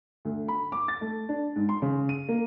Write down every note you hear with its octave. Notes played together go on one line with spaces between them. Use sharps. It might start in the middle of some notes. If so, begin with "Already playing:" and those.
D2
B5
D6
A6
A3
D4
G#2
C6
C#3
D#7
A#3